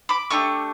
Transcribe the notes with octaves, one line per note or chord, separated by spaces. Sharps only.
B5 D6
A3 D4 G4 C#6 E6